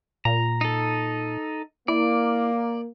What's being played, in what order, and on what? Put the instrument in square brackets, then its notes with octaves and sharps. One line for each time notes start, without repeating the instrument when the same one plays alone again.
[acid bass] A#2 [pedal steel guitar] A#5
[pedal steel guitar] D#4 A4
[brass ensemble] A#3 [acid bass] E4 [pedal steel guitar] D5